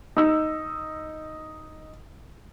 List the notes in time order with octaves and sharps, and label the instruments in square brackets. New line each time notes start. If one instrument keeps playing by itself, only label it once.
[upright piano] D#4 E6